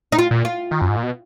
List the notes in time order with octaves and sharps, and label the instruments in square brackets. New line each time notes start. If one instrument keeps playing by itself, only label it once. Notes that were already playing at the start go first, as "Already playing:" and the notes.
[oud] D#4
F4
[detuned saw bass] A#2
[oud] F4
[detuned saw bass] D#3
F#2
G#2
A#2
B2